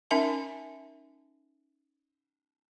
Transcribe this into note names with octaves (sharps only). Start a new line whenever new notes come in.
C#4 D#4 A#4 E5 G#5 A5